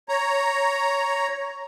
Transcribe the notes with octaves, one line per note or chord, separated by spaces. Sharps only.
C#5 A#5